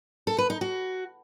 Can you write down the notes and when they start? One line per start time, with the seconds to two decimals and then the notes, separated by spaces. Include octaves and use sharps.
0.27 A4
0.38 B4
0.50 D#4
0.61 F#4